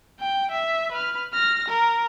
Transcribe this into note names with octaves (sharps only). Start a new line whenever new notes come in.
G5
E5
B4 F6
F6 A#6
A#4